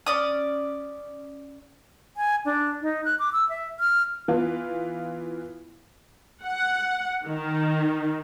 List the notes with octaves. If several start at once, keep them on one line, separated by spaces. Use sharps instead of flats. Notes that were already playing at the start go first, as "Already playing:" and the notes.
C#4 D5 D#6
G#5
D4
D#4
F#6
D6
E6
E5
F6
E3 B3 F4
F#5
D#3